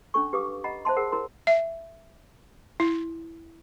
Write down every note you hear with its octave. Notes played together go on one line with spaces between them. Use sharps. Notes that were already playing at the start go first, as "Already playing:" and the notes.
C#4 D4 A4 C#6
G4 B4 F5 D6 D#6
D#5 F#5 A#5 B5
C5 E5 A5 C6
G#4 A#4 F#5
E4 A#4 A#5 C6
E5
E4